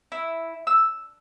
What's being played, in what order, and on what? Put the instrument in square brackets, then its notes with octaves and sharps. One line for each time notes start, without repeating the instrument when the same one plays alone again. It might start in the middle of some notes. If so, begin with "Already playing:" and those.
[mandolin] E4
E6